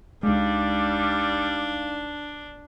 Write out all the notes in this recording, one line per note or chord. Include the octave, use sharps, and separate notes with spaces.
C#2 G3 G#3 D4 D#4 F5